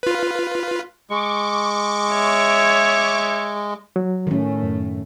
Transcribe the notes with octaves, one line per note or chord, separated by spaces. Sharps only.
F4 B4
G#3 C#6 D6
C#5 E5
F#3
A2 D#3 A3 C#4
F#2